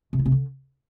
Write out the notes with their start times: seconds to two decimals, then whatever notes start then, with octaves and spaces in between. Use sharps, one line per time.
0.13 C3
0.19 D#4
0.26 C3
0.32 D3